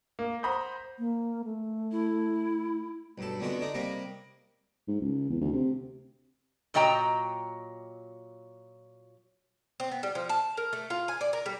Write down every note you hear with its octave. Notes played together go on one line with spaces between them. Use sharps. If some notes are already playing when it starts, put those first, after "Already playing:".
A#3
C5 F#5 A#5 B5 D#6 G6
A#3
A3
E4
B1 G2 A4
F2 D3 G#3 B3 F#4
D4 D#4 D#5
C3 G3 A#3 D#5
G#2
C#2
E2
D2
C3
A#2 F#3 D#5 G5 A#5
C4
B3
G3
F3
A5
A#4
A3
F4
G#5
D5
A#4
G3